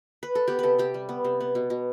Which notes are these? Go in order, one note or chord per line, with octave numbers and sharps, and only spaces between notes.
B4
A4
B3 G4
C3 A4 B4
C3 G4
G3
B3
C3
B3
B2
B2